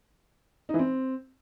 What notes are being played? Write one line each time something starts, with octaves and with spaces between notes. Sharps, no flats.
D#4
E3
C4